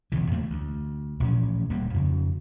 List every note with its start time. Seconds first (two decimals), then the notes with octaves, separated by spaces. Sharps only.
0.12 D#1 E2 C#3 E3
0.31 E2 A3 A#3
0.50 D2
1.20 A1 A#2 F3 C#4
1.70 D#1 D2 G3 A#3
1.94 F2 C#3